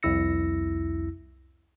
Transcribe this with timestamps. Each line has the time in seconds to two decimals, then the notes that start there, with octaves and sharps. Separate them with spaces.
0.03 C2 F2 E4 E6 A#6 C#7